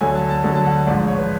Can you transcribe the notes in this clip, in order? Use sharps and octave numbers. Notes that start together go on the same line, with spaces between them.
D2 D3 F#3 G#5
A5
A5
D2 D3 F#3 A5
A5
F#5
A1 G#2 F3 D5
C#5
B4